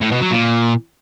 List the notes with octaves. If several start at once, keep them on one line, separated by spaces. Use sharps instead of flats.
A2
B2
F#3
A#2